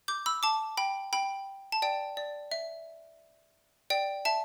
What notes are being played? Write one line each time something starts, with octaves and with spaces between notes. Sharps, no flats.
D6 G6
B5 E6
A5 D6
G5 B5
G5 B5
A5
D5 G5
D5
E5
D5 G5
E5 A5